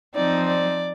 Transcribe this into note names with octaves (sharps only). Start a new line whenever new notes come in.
F3 C4 D#4 D5
D5